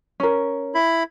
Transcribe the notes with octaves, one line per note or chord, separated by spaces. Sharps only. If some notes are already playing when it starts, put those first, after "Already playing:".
C#4 A#4
E4 B5